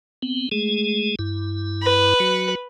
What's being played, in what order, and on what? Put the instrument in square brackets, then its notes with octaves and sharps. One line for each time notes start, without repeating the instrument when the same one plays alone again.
[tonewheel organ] B3 C4
G#3 A3 G#4
G2 E4
[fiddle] B4
[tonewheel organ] F#3 F#4